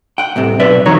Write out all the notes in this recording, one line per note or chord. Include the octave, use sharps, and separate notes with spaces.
F#5 G5
C2 A2 C3
B1 B4 D5 E5
C2 F2 D#3 F#4 C#5 A#5